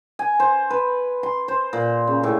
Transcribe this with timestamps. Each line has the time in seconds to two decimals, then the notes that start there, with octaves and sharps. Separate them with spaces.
0.19 G#5
0.40 C5
0.70 B4
1.23 C6
1.48 C5
1.73 A#2
2.07 C#3
2.23 A2